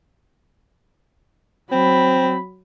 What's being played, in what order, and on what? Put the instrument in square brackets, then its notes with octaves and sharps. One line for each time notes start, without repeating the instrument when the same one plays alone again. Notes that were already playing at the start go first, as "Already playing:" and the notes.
[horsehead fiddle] F#3 B5 [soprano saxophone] C4